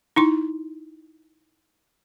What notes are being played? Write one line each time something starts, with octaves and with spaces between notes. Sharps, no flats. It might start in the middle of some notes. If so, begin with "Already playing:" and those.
D#4 E4 C6